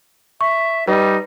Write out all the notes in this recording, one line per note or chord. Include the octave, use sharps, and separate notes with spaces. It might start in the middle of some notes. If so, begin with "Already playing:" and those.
E5 C#6
G3 D#4 B4